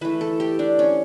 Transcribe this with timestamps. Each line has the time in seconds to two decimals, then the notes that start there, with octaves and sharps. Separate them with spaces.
0.01 E3 A3 B4
0.21 A4
0.40 G4
0.59 D4
0.79 C#4